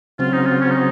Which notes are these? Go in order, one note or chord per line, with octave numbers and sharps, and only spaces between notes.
C#3 F#3 C4 F4
D#4
F4
C#4
D#4